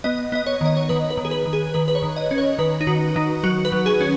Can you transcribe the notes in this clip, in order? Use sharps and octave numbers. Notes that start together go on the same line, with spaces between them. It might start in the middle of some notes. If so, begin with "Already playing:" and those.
B3 D#5
B3 D#5
C#5
D#3 D#5
C#5
D#3 B4
B4
D#3
G#4
B4
D#3
G#4
D#3 B4
B4
C#5
D#3
D#5
C#4
C#5
D#3 B4
D#4
D#3 F#4
D#3 D#4
F#3 F#4
B4
F#3
G#4
C#4